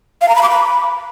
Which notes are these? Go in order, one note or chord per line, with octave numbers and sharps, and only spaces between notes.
F5
A#5
B5
D6
B5